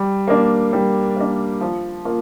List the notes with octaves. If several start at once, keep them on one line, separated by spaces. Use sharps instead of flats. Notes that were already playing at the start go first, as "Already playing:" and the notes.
Already playing: G3
A#3 D4
G3
A#3 D4
F3
A#3 F4